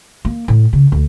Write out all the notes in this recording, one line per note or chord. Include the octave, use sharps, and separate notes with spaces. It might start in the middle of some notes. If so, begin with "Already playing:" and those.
A#3
A2
C#3
D2